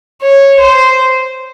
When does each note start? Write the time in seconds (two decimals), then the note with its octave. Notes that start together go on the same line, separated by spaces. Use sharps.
0.22 C#5
0.60 C5